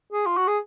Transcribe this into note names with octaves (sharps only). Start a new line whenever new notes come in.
G#4
F4
F#4
G#4